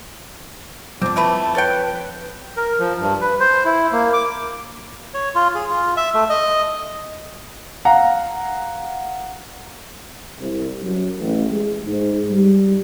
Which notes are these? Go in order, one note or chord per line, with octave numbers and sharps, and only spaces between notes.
F2 C4 D4 D6
E3 A3 B4 A5
A4 B4 C#5 G5
A#4
F3
G2
B4
C5
E4
A#3
D6
C#5
F4
G#4
F4
E5
A3
D#5
F5 F#5 A#5
C2
F#2
A1
G#3
G#2
G3